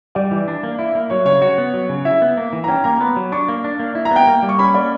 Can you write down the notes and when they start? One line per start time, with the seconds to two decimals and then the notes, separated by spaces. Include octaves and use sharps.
0.15 G3 D5
0.31 E3
0.48 D4
0.63 A#3
0.79 E4
0.95 A#3
1.10 F#3 C#5
1.26 C#3 C#5
1.41 F#4 C#5
1.58 B3
1.74 F#3
1.89 C#3
2.05 E4 E5
2.22 B3
2.37 A#3
2.53 E3
2.64 A#5
2.68 C#4 G5
2.84 A#3 A#5
3.00 B3 B5
3.16 F#3
3.32 D4 C#6
3.48 A#3
3.64 D4
3.79 A#3
3.95 E4
4.05 A#5
4.11 B3 G5
4.27 A#3
4.43 G3
4.49 C#6
4.59 C#4 B5
4.74 A#3 D5